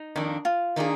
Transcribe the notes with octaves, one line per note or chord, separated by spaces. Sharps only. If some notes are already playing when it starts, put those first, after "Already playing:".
Already playing: D#4
F2 D#3 A#3 D4
F4
D#3 A#3 D4 G#4